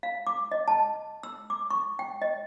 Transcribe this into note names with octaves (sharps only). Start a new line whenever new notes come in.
F5
D6
D#5
A5
E6
D6
C#6
G5
D#5